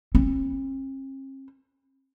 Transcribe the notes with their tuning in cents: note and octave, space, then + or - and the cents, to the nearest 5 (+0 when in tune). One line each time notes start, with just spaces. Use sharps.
C4 +45